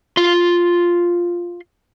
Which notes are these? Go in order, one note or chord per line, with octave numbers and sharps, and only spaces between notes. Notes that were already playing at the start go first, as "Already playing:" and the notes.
F4 C6